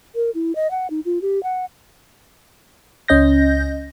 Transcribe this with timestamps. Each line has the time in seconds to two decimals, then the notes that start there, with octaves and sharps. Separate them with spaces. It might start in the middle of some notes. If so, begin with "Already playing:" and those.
0.15 A#4
0.35 E4
0.55 D#5
0.71 F#5
0.90 D#4
1.05 F4
1.22 G4
1.43 F#5
3.08 C#2 C#4 D#5 G6 A#6